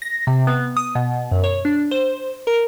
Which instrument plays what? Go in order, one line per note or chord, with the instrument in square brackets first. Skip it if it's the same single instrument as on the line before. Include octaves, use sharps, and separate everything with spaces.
[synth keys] A#6
C3
B3
D#6
B2
F#2
C#5
D4
C5
A#4